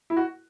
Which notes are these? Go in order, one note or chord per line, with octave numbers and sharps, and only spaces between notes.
E4
F#4